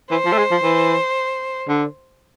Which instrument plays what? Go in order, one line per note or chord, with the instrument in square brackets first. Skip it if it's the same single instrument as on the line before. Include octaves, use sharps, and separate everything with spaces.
[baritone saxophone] E3 [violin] C5
[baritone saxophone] F3
A3
G#3
F3
E3
D3